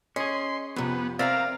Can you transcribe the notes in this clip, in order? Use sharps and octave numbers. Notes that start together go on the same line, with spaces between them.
C#4 G#4 D#5 C6
F2 C3 B3
C4 A#4 D5 E5 F5 G5 G#5 A#5